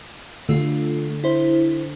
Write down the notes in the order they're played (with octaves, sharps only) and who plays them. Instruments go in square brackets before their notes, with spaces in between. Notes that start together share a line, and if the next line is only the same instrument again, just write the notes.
[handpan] D3 [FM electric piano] A3 F4
[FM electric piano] E4 C5